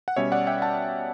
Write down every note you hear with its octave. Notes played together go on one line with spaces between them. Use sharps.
F#5
B2 G3 C#4 C#5 E5
D5 F#5
E5 G5
F#5 A5